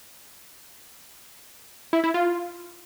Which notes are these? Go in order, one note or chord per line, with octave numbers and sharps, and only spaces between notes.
E4
E4
F4